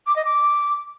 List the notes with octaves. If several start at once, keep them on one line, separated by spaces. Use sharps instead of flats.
D6
D#5
D6